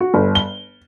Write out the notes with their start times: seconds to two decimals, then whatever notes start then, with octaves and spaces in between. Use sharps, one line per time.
0.01 F#4
0.14 G1
0.35 G7